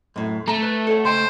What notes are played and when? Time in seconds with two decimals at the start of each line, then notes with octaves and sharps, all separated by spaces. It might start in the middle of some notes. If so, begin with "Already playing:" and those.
0.16 F#2 A2
0.48 A3 A5 A#5
0.62 B4
0.87 A4 C#5 F#5
1.05 C#2 C5 G5